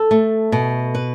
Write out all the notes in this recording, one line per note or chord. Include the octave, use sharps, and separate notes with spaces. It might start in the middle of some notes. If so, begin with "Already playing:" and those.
Already playing: A4
A3
B2
B4